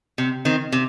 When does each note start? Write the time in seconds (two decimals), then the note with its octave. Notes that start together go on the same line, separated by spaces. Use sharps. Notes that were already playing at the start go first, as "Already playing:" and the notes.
0.18 C3
0.45 D#3 C4
0.72 C3